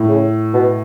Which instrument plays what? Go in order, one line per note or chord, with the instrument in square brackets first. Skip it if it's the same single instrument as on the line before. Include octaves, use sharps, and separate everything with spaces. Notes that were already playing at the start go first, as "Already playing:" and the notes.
Already playing: [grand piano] A2
[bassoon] C#3
B2